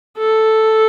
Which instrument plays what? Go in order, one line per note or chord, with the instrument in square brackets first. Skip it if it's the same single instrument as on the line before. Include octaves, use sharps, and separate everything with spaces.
[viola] A4